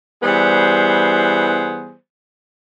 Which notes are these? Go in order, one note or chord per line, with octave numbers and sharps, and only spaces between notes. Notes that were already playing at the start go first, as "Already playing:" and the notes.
E3 G3 B3 G#4 C5